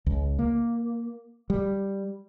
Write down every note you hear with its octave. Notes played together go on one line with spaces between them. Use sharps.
C#2
A#3
G3